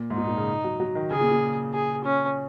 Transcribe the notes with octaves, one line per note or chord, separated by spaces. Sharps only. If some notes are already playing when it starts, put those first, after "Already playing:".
Already playing: A#2
G#2
A#2 D#4
A#2
C#3
F#3
F#3
D#3
C#3 G#4
A#2
A#2
G#4
C#4